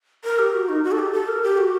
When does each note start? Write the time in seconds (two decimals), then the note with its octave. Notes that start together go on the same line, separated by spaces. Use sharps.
0.24 A#4
0.39 G4
0.54 F#4
0.69 D#4
0.84 F#4
0.92 A4
0.99 G4
1.13 A4
1.28 A#4
1.43 G4
1.58 F#4